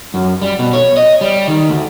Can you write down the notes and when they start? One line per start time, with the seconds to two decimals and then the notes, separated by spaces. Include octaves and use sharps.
0.14 F#2
0.41 G3
0.59 B2
0.73 C#5
0.97 D#5
1.21 G3
1.48 D#3
1.68 D2